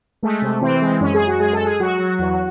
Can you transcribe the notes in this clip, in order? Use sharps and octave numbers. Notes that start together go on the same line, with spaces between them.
G#3 A3
C3
E3 C4
G#3
F#2 C#4
G#4
F#2
F#4
G#3 G#4
A4
G#3
G#4
F#3 F#4
F#3
E2